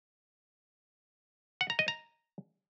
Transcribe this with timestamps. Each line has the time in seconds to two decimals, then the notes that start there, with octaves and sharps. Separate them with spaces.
1.61 F#5
1.70 A#5
1.79 D#5
1.88 A#5